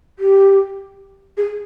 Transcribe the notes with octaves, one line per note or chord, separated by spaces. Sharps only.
G4
G#4